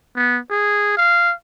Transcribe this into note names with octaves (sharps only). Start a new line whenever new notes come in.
B3
G#4
F5